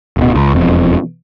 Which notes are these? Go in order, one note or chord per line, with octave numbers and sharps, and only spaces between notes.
D1 B2
C#2
E1 F2